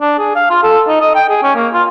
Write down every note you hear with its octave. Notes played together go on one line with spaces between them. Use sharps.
D4
G#4
F5
F4
A4
D#4
D#5
G5
G#4
C#4
A#3
F4